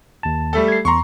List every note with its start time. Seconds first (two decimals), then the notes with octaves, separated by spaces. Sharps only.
0.23 D#2 A5
0.53 G3 A3 A4
0.68 G#6 C7
0.85 E2 A#5 C6 C#6